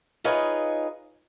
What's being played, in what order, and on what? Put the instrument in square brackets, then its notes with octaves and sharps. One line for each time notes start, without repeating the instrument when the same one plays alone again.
[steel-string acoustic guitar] D#4 F4 G#4 B4 C#5 D#5